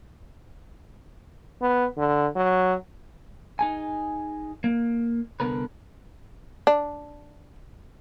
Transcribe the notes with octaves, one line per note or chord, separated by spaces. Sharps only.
B3
D3
F#3
D#4 G#4 G#5
A#3
C2 D3 E3 B3 A#4 B4
D4